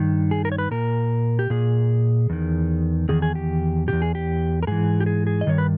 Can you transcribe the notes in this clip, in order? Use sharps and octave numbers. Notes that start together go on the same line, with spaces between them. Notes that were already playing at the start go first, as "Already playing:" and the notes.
Already playing: G2 D#3
G#4
A#4
C#5
B4
A#2 A#4
G4
A#2 G#4
E2 D#3
E2 D#3 G#4
G#4
G4
E2 B2 G4
G#4
G4
A#4
G#2 E3 G#4
G4
G#4
G#4
D#5
G2 D#3 C#5
B4